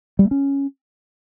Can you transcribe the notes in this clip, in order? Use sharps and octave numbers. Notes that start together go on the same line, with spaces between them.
G3
A3
C#4